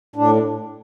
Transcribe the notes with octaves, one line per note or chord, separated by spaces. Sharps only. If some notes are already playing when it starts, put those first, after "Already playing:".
A2 D4